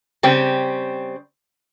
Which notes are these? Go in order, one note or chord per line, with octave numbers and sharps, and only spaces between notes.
C#3 G3 C4